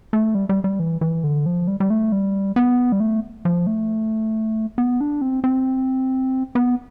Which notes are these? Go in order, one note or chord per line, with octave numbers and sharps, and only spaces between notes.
A3
G3
G3
G3
E3
E3
D3
F3
G3
G3
A3
G3
B3
G3
A3
F3
A3
B3
D4
C4
C4
B3